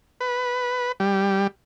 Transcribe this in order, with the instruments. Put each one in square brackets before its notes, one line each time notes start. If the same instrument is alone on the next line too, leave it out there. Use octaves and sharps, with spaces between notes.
[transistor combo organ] B4
G3